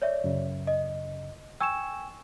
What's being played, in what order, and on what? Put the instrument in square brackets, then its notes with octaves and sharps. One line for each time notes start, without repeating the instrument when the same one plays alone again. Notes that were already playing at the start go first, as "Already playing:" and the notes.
[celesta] C#5 D5 E5
[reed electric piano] F#2 C#3
[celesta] D#5
[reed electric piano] G5 G#5 C#6 [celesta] E6 E7